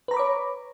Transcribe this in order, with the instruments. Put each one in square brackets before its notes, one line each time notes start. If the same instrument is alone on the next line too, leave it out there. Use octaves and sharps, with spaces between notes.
[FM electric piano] B4
A#5
B5
D6
C#5